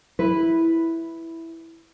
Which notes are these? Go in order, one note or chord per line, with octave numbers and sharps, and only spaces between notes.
E4 B4